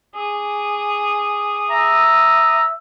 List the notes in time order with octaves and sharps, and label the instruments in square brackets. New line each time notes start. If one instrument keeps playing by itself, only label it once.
[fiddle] G#4 [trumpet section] D6 D#6
[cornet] E5 [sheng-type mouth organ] A#5